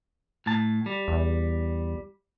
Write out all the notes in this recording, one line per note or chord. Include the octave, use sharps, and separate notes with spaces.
A2 A5
G3
E2